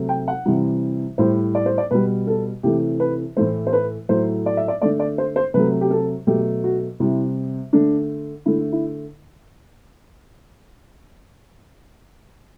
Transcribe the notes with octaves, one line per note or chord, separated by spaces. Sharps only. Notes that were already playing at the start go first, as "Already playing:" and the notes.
Already playing: C3 F#3 A3
G5
F#5
C3 E3 G3
A2 G3 C5
D5
C5
D5
B2 G3 B4
A4
C3 E3 A3 G4
B4
A2 E3 A3 C5
C5
B4
A2 F#3 A3 C5
D5
E5
D5
D3 A3 D5
D5
C5
C5
C3 F#3 A3 B4
G4
A4
B2 F#3 A3 G4
F#4
C3 G3 E4
D3 A3 D4
D3 A3 E4
E4